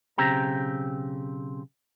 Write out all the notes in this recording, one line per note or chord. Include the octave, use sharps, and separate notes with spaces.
B1 C#3 C4 G4 A#5